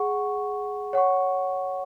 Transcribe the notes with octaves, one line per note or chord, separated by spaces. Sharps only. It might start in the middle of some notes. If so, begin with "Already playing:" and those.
Already playing: G#4 F#5 C#6
C#5 F#5 C#6